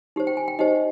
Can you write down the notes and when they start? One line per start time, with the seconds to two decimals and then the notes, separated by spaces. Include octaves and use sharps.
0.16 D#4 G4 C5
0.27 G5
0.37 G#5
0.48 G5
0.59 D#4 G4 C5 D#5